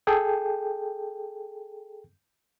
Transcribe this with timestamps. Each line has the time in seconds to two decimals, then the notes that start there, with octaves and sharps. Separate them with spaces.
0.07 G#4 A4 G5